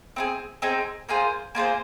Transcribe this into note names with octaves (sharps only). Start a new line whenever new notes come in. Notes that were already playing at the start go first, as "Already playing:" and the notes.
C4 D#4 G#4
C4 D#4 G#4
A#3 F4 G#4 C5
A#3 F4 G#4 C5